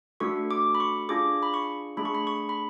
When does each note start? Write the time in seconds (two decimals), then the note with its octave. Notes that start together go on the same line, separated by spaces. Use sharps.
0.20 A3 D4 F#4 A4 C#6
0.51 D6
0.75 B5
0.80 C#6
1.09 D4 F4 G#4 D6
1.43 B5
1.54 C#6
1.97 A3 D4 G#4 B5
2.05 C#6
2.15 B5
2.27 C#6
2.49 B5